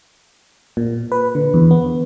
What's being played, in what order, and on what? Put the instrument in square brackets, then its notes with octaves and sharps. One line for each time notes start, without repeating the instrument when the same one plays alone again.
[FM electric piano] A#2
B4
D3
E2
B3